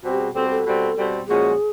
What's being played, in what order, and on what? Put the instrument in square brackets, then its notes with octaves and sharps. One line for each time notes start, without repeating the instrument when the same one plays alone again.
[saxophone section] B2 G3 C4 [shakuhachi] F#4
[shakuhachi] G4
G#4
[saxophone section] B2 G3 C4 [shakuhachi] A4
[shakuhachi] A4
[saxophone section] B2 G3 C4
B2 G3 C4
[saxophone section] A#2 F3 G#3 C#4 F#4 [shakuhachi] G#4